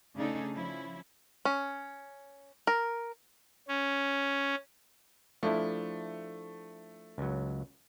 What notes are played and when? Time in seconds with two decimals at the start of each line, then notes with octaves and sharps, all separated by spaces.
0.16 C#3 A3 D4 D#4 G#4 A4
0.54 F3 C#4 E4
1.45 C#4
2.67 A#4
3.68 C#4
5.43 F3 A3 D4 E4
7.18 C#2 F#3